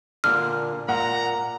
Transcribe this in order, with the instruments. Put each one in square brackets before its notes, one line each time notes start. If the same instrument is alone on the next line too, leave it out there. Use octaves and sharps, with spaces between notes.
[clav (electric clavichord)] A#2 D3 [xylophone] F6
[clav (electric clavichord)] A#2 [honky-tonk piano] F#5 [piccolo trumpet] A#5